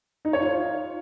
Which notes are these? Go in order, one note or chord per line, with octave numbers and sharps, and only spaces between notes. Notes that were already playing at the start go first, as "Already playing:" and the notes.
D#4
C#5
F4